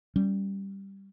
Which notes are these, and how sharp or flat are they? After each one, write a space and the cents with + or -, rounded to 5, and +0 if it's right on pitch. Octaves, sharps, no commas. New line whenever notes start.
G3 +0 C#4 +0